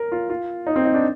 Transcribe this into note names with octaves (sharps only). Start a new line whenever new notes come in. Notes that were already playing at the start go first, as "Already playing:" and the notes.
Already playing: A#4
F4
F4
D#4
C4
D#4
D4